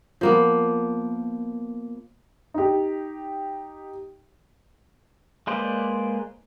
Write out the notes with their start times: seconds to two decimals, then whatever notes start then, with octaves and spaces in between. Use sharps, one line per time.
0.21 F3 A#3 B3
2.54 D#4 G4
5.47 G#3 A#3 B4 C5 D5